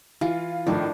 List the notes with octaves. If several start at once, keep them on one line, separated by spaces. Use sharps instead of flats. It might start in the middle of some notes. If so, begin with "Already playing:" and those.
E3 F4
A2 D#3 F3 D4